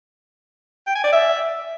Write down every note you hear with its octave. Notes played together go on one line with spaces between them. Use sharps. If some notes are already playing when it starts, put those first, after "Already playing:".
G5
G#5
D5
E5